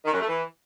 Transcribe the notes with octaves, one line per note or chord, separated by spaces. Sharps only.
D#3
F#2
A3
E3